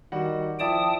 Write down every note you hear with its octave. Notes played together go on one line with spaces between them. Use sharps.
D#3 G3 F#4 F#5
F3 E4 D5 G5 A5 D#6